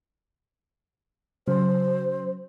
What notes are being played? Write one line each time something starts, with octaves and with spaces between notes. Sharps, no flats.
C#3 F#3 C5